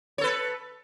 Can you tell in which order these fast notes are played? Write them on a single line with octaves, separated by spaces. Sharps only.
C#5 A4 B4